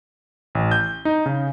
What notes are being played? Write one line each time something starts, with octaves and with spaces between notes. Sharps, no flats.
A1
G6
D#4
C#3